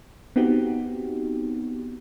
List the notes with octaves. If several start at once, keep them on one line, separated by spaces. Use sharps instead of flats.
B3 C4 D#4 F#4 G4